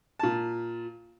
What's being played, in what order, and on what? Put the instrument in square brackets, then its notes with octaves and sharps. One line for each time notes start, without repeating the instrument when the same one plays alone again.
[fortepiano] A#2 A5